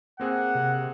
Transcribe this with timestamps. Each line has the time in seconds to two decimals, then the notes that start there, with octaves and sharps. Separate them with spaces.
0.20 A#3 C4 G#4 F#5
0.55 C3